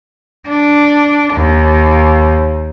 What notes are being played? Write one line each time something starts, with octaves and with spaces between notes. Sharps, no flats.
D4
D#2